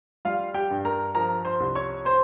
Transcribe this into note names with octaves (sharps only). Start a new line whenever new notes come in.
G3 F4 F5
G4 G5
G2
A#4 A#5
F3 A#4 A#5
C5 C6
C2
C#5 C#6
C5 C6